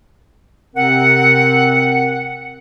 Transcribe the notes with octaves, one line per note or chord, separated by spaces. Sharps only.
C3 C4 A#4 F#5